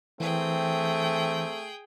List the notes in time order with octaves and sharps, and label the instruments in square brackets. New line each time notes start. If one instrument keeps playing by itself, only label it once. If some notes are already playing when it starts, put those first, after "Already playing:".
[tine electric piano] E3 [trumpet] A3 [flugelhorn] C4 [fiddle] G#4 G5